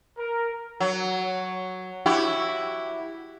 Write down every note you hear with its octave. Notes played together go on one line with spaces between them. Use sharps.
A#4
F#3
E4 F#4 G4